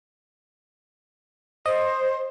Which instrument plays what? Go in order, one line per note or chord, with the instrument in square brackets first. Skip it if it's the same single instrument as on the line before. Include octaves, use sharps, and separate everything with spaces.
[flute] C5 [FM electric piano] D#5